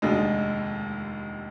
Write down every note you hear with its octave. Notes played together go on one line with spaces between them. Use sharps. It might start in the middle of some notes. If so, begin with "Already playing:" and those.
F1 D#2 D3 G#3 D#4